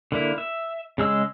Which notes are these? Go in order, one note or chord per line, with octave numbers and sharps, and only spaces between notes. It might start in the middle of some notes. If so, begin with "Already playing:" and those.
D3 A#3 E4
E5
C#3 G#3 E6